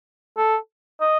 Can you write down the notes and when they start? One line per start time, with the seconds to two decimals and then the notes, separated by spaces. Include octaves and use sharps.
0.37 A4
1.01 D#5